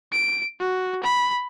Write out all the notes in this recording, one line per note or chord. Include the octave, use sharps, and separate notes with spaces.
D7
F#4
B5